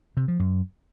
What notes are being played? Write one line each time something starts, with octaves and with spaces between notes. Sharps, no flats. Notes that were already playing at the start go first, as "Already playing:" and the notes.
C3
F3
F#2